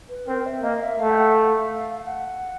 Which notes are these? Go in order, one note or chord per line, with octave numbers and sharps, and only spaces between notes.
B4
C4 A#4
E5
A#3 D#5
E5
A3 F5
G5
F#5
F5
F5
F#5